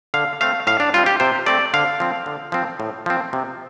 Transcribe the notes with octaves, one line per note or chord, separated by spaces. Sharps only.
D3 F5
A3 C4 F5
A2 F5
D4
G3 C4 F4
G4
C3 C5
A3 C4 D5
D3 F5
F3 C4
D3
F3 C4
A2
F3 C4
C3